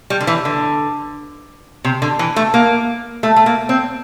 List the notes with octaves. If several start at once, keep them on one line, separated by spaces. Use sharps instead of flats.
G3
D3
E3
D3
C3
D3
E3
A3
A#3
A3
A3
A#3
C4